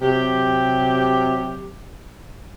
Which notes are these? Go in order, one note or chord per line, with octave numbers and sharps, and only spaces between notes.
C3 F#3 G4